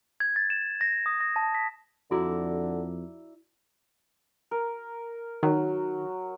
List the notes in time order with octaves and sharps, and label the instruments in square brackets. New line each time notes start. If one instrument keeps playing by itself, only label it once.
[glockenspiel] G#6
A6
E7
A#6
D#6
A#6
A5
B6
[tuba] F2 [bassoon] D3 [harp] E4 D5 A#5 [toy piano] F#4
[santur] A#4
[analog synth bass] D#3 [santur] F#3